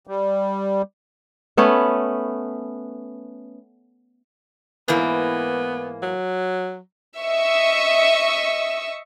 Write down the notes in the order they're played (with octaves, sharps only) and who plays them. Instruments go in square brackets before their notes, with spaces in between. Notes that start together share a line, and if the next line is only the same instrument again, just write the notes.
[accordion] G3
[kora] A3 B3 C#4 B4
[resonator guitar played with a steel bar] G#2 E3 A#3 [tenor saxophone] B3
[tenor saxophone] F#3
[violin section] D#5 E5 C#6 E6